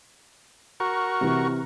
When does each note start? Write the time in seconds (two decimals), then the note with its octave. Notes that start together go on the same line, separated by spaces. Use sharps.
0.80 F#4 A#4 C#6
1.21 C3 E3